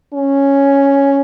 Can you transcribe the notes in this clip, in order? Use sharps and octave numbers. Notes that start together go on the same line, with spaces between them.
C#4